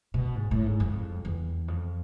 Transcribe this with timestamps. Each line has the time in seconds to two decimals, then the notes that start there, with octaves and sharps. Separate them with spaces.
0.14 B2
0.35 G#2
0.51 A2
0.66 G#2
0.80 F2
1.25 E2
1.68 F2